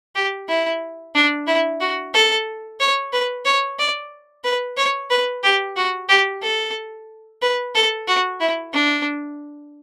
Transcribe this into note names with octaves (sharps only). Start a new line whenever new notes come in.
G4
E4
D4
E4
F#4
A4
C#5
B4
C#5
D5
B4
C#5
B4
G4
F#4
G4
A4
B4
A4
F#4
E4
D4